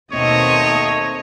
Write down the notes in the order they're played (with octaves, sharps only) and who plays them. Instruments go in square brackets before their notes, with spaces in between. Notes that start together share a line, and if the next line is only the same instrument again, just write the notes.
[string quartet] D#2 A3 A#5 [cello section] B2 C4 [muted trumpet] C#5 [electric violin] D#5 D#6